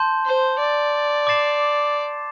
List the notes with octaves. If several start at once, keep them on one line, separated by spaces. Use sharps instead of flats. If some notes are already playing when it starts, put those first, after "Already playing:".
Already playing: A5 C6 G6
C5
D5
D6 A6 C7 E7